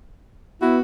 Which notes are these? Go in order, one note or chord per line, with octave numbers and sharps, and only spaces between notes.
B3 E4 F#4